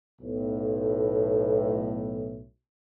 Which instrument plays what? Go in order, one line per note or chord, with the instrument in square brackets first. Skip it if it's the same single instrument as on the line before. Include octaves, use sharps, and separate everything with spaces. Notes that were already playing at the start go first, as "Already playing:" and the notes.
[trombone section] B1 A2